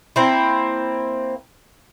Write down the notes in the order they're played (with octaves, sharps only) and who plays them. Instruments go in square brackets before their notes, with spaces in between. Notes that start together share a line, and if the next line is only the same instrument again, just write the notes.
[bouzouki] A#3 C4 E4